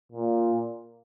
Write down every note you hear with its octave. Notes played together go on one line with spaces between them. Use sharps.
A#2